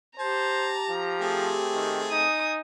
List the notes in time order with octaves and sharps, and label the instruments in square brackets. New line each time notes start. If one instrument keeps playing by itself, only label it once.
[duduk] G4 [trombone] C5 [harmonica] A5 [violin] A#5
[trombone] F3
[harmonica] A3 C4 G#4
[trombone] D#3
[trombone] D#4 [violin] G#5 D#6